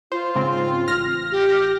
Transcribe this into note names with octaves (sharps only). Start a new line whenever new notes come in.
F4 C5
G#2 C#3 C4
A1 F6 A#6
G4